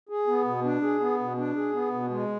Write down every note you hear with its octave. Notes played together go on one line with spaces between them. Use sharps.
G#4
B3
B2
D4
G#4
B3
B2
D4
G#4
B3
B2
G#3